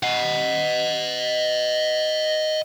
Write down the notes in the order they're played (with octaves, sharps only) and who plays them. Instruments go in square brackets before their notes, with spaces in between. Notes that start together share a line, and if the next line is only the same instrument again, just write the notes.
[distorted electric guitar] D#5 F#5